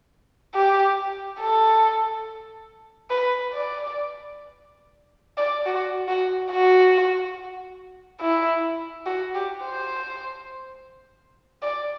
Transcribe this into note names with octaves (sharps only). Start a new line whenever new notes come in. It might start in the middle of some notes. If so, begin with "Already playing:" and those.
G4
A4
B4
D5
D5
F#4
F#4
F#4
E4
F#4
G4
C5
D5